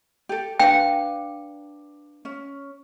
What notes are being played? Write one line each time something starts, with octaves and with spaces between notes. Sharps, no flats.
G4 A4
D4 B4 F5 G5
C#4